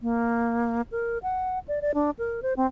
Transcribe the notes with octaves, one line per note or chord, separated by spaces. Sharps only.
A#3
A#4
F#5
D5
D5
D4
A#4
C5
C4